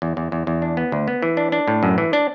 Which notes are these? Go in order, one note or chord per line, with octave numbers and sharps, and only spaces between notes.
E2
E2
E2
E2
D4
B3
D2
B3
E3
D4
D4
A2
F#2
E3
D4